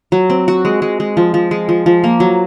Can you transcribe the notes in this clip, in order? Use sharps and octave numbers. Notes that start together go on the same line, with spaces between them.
F#3
C4
F#4
G#3
G#3
G#3
F3
F3
G#3
F3
F3
A#3
F#3